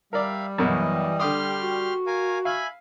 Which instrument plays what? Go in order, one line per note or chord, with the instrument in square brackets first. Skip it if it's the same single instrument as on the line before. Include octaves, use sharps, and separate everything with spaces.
[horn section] G3 [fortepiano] A#4 D5 [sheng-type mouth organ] E5 F5
[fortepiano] F#2 B2 [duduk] E3 [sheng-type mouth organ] D#5
[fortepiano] D3 D6 D#6 [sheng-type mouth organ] G4 C6 F6
[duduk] F#4
[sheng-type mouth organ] A#4 F5 G#5
[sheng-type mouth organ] E5 G#5 B5 [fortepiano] F5